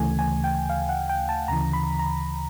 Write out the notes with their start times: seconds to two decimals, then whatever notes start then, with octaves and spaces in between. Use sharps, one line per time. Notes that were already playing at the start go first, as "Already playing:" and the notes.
Already playing: D2 C#3 E3 A3 G#5
0.19 G#5
0.44 G5
0.69 F5
0.89 F#5
1.09 G5
1.29 A5
1.48 D2 C#3 E3 A#5
1.73 B5
1.99 A#5